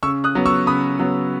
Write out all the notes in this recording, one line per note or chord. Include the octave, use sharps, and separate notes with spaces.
C#3 C#6 E6
D#6 F#6
F#3 B3
C#6 E6
C#3 B5 D#6
F#3 B3